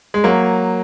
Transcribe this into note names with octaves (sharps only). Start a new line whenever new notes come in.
G#3
F#3 A#3